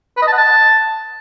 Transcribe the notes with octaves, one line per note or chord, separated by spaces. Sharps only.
B4
D#5
A5
F#5
A5